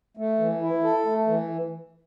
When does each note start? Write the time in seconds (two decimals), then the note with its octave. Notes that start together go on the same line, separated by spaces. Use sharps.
0.17 A3
0.39 E3
0.62 E4
0.84 A4
1.05 A3
1.27 E3